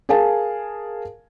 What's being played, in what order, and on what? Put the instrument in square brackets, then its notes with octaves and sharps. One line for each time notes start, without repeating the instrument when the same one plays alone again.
[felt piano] G#4 A#4 F5 G#5 A5